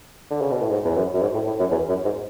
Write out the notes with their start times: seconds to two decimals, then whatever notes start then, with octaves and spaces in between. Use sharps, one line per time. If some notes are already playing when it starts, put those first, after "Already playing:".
0.31 D3
0.41 C#3
0.51 B2
0.62 A2
0.71 G#2
0.85 E2
0.96 F#2
1.14 F#2
1.22 G#2
1.34 A2
1.46 A2
1.60 F#2
1.71 E2
1.89 F#2
2.05 G#2